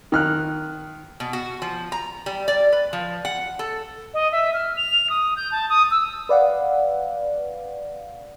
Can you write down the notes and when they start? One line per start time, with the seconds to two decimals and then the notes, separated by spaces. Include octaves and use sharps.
0.12 D#3 F6 F#6
1.20 B2
1.33 F#4
1.62 F3
1.92 A#5
2.26 G3
2.48 D5
2.72 B4
2.93 F3
3.25 F#5
3.59 A4
4.14 D#5
4.32 E5
4.53 F6
4.77 F7
5.10 D#6
5.37 G6
5.52 A5
5.69 D#6
5.91 E6
6.29 B4 D5 F5 F#5